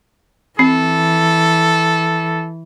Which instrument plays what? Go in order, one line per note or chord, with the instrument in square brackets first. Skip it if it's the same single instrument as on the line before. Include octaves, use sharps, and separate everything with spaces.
[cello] E3 [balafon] C4 [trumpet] A4